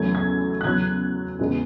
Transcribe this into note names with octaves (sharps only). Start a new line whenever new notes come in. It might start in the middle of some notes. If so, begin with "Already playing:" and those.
Already playing: E2 C#3 F#3 A3 G#6
G#6
F#6
E2 C#3 F#3 G#6
E2 C#3 G#3 B3